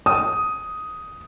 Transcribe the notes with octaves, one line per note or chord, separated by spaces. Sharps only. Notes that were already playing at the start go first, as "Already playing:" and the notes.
D#6